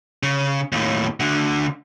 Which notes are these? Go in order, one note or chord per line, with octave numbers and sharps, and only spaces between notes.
C#3
D#2 A2
D2 D3